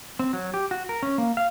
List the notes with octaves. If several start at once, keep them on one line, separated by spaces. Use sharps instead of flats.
C4
F#3
G4
F#4
A#4
C#4
A#3
F5